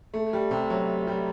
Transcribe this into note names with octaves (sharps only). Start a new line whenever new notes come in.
A3
G3
C3
F#3
G3